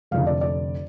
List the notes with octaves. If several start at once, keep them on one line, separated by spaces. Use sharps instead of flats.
F1 F2 D3 F5
D5
D5